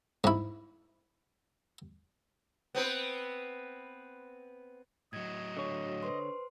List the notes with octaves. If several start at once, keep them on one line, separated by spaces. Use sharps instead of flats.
G#2 E4
B3 C4 B4
A2 F#3 D#5 G#6
D3 F#4 C#5
B4 C5 C6